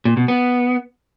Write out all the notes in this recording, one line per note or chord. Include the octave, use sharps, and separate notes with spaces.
A#2
B2
B3